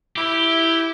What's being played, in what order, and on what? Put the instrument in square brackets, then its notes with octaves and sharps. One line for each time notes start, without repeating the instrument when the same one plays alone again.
[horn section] E4 [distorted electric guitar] G4